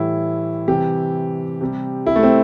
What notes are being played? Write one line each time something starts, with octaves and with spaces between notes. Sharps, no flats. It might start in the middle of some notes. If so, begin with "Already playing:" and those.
Already playing: A2 E3 G3 E4
C3 E3 G3 G4
C3 G3
E4
A3
C4